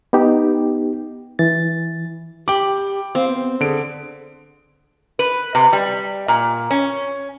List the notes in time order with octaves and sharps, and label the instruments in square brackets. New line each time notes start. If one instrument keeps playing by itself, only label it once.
[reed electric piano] B3 D#4 G4
E3 A6
[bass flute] G4 [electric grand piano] G5 D6 [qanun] B5
[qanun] C4 [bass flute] F5
[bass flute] B3
[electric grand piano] D3 D7 [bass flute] G#4
[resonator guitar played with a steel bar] B4
C3
G3
A#2
C#4